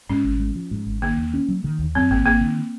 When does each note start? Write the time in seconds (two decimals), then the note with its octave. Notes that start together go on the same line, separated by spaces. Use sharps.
0.09 G#2 C#4
0.25 G#1
0.40 G#3
0.55 F3
0.71 G#2
0.86 G#1
1.02 D#3 A#3
1.17 D#2
1.34 C#4
1.48 F#3
1.64 D#3
1.79 D#2
1.95 F#2 C4
2.10 G#1 A#3
2.26 G#1 A#3
2.41 D#3